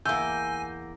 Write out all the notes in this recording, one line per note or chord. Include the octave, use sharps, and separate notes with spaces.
E2 A#3 G#5 E6 G6